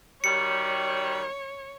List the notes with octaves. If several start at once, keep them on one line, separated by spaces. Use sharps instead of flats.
D#3 F#3 G3 C#5 C#7